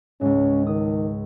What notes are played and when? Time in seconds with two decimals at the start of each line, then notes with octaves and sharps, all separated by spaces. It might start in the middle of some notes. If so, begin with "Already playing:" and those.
0.21 C#2 G#2 C#4
0.67 D#3 D#6